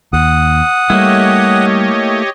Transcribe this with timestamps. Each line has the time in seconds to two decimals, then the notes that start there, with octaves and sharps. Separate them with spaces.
0.13 D#2 F#5 D#6
0.90 G3 A3 A#3 E4 G4 C#5 D#5